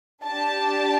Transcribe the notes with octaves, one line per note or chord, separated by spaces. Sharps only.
D4 G4 A5